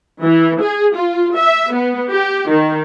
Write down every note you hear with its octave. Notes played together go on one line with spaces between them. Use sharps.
E3
G#4
F4
E5
B3
G4
D#3